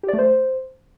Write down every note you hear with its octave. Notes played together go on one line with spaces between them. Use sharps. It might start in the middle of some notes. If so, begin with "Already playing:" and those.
G4
D5
A3
C5